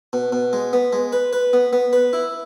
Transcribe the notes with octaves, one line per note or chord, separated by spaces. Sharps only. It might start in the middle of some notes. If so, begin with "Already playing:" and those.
B2
B2
G#3
B3
G#3
B4
B4
B3
B3
B4
E4